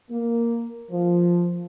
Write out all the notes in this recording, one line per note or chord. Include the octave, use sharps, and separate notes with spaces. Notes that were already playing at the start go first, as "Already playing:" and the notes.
A#3
F3